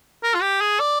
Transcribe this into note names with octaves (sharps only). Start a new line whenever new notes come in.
A#4
F4
G4
G#4
D5